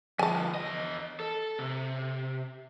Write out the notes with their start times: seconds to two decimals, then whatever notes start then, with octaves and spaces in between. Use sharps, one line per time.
0.19 D3 F3 G#5 A5
0.54 E2 D#5
1.20 A4
1.59 C3